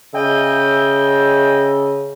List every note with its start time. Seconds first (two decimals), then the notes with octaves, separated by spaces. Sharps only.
0.14 C#3 D#5 E5 G5